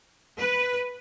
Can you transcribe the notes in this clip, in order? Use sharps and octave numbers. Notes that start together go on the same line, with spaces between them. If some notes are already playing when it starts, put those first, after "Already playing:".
B4